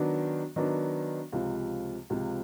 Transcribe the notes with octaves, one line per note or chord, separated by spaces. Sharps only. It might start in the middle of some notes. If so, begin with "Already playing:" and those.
Already playing: D#3 F#3 B3 D4
D#3 F#3 B3 D4
C#2 C3 F3
C#2 C3 F3